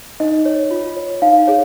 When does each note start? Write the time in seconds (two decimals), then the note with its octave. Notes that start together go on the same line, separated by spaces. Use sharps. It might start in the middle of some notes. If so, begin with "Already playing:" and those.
0.20 D#4 D#5
0.45 C#5
0.71 F4
0.97 C#5
1.22 D#4 F5
1.47 G#4 C#5